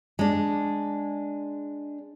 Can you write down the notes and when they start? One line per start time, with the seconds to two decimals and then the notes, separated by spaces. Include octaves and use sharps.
0.19 G#3 D4